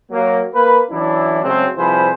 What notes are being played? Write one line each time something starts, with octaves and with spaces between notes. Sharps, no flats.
F#3 A#3
A#3 B4
E3 F#3 C#4 D4 E4
C#3 F#3 G#3 A3 C4
C2 F3 E4 G#4 B4 C5